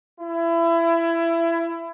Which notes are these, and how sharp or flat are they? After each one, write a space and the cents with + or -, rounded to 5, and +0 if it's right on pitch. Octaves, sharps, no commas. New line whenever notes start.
E4 +25